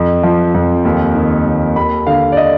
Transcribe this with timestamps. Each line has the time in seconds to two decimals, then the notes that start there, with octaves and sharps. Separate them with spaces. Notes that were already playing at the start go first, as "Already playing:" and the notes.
Already playing: F2
0.23 F3
0.54 F2
0.85 D#2
1.15 D#3
1.46 D#2
1.76 D#2 B5
2.07 D3 F5
2.32 D5
2.37 D#5